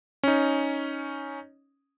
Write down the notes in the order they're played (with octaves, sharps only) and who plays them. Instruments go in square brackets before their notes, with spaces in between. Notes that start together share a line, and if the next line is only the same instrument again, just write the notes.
[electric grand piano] C#4 D#4